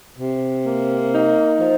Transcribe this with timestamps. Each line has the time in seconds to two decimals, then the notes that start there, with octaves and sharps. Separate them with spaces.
0.18 C3
0.66 A#3
1.13 D#4
1.60 F3